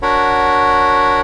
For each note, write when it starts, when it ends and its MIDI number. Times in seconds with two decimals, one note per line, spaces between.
0.02 1.21 62
0.02 1.21 66
0.02 1.21 70
0.02 1.21 73
0.02 1.21 78
0.02 1.21 83